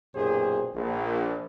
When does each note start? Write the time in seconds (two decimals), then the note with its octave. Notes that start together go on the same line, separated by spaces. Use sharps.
0.15 B1 F#2 A#2 G4 G#4 C5
0.75 A#1